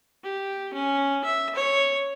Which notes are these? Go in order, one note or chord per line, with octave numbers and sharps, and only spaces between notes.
G4
C#4
E5
C#5